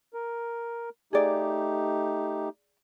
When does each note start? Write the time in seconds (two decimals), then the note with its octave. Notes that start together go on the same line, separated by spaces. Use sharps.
0.14 A#4
1.13 A3 D#4 G4 G#4 D5